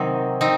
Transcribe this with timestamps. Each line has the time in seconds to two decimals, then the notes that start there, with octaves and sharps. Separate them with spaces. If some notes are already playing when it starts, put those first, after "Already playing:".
Already playing: C3 D#3 F#3 C4 D#4
0.41 C4 D#4